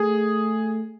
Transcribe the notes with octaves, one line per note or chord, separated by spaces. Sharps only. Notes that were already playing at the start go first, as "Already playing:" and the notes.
Already playing: A3 G#4